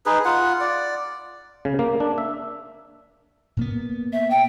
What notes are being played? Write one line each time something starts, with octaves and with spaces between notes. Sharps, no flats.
D#4 G#4 B4
F4 F#5
D5
C#3
A#3
D4
E5
A#2 A#3 B3
E5
G5